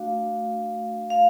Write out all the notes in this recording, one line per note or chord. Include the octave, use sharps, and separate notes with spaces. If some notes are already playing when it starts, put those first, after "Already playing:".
Already playing: A3 D4 F#4 F5
F5